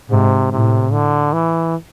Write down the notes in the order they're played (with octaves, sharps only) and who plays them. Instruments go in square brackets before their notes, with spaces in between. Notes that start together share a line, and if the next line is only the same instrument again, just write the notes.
[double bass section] G#2 [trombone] C3
[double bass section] A2 [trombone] C3
[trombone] D3
E3